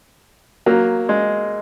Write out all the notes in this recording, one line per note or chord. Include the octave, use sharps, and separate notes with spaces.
F#3 A#3
G#3